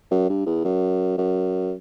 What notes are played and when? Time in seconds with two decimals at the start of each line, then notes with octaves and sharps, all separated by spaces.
0.11 F#2
0.29 G2
0.47 E2
0.65 F#2
1.18 F#2